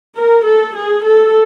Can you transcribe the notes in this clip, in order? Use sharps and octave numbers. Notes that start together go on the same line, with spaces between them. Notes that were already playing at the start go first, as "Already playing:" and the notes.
A#4
A4
G#4
A4